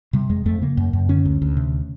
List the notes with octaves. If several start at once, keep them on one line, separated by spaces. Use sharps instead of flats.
C3 G3
F2 G#3
F2 A3
C#3 A#3
F#2
F#2
D3 C#4
D2
D2
C3